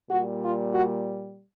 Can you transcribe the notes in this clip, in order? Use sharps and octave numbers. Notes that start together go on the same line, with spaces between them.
A#2 G3 F#4
F4
F#4